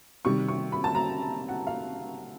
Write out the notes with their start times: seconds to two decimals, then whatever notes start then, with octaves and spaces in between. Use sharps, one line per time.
0.25 C3 D#3 G3 C#6
0.48 C#6
0.72 B5
0.84 A5
0.95 A#5
1.49 F#5
1.67 F5